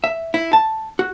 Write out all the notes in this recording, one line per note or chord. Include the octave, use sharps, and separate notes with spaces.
E5
E4
A5
F#4